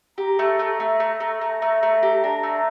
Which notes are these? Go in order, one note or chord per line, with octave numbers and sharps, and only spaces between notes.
G4 A#5
A3
A3
A3
A3
A3
A3
A3
A3
G4
D4
A3